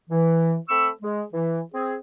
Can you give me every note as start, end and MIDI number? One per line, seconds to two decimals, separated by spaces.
0.10 0.55 52
0.69 0.89 57
0.69 0.89 60
0.69 0.89 83
0.69 0.89 85
0.69 0.89 88
1.01 1.23 56
1.33 1.59 52
1.74 1.95 60
1.74 1.95 68